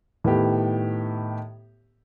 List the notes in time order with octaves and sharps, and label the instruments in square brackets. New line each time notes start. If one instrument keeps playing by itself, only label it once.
[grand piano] A2 D#3 B3 G4